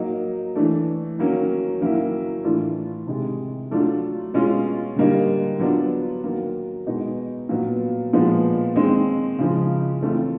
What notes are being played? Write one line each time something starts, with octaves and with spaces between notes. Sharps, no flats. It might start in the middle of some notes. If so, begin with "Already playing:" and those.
Already playing: F#3 A#3 D#4
E3 A3 D4
D#3 F#3 A#3 C#4
D#3 F#3 A#3 C#4 E4
A2 E3 A3 D4 F4
C3 D#3 G#3
F#3 A3 D4 F4
B2 G#3 C#4 F4
D3 G3 A#3 D#4
F#3 B3 D4 F4
D#3 F#3 A#3
B2 G#3 B3 D#4
A#2 F#3 B3
A#2 F3 G#3 B3
D#3 G#3 C4
C#3 F3 G#3
E3 A3 C4 F4